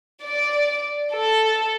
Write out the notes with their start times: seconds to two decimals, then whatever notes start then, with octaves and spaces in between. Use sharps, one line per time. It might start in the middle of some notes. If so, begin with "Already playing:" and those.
0.23 D5
1.13 A4